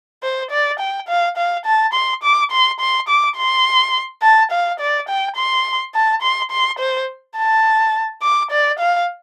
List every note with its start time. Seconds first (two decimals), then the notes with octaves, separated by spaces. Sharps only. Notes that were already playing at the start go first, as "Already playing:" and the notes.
0.23 C5
0.51 D5
0.80 G5
1.09 F5
1.37 F5
1.66 A5
1.94 C6
2.23 D6
2.51 C6
2.80 C6
3.09 D6
3.37 C6
4.23 A5
4.52 F5
4.80 D5
5.09 G5
5.36 C6
5.95 A5
6.22 C6
6.51 C6
6.79 C5
7.37 A5
8.23 D6
8.51 D5
8.79 F5